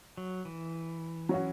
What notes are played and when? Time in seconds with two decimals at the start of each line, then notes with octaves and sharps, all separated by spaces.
0.17 F#3
0.45 E3
1.29 F#3 C#4 F#4